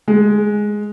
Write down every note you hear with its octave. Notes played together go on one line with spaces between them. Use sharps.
G#3